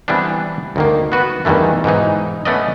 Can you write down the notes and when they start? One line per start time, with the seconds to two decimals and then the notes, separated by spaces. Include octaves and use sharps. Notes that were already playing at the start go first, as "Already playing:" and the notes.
0.08 E3 G3 B3 C4 D4
0.76 D2 D#3 A#3
1.12 B3 F#4 B4
1.45 E2 G2 D#3 E3 A3
1.84 G#2 B2 E3 D#4
2.45 A3 B3 C#4 D5 D#5